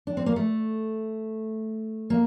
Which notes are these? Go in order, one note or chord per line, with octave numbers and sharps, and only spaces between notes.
D4
C4
A#3
A3
A#3